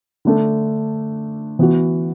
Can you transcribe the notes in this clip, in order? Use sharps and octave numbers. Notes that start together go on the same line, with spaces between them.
D3 A3 D4 A4
E3 B3 F#4